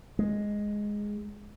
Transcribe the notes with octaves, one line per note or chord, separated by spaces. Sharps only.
G#3